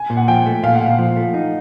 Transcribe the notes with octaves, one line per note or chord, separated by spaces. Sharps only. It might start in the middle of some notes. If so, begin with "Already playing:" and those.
Already playing: G#5
A#2
F#5
F3 G5
A3
A#2 F5
F#5
A#2
F5
F3
A3
D#4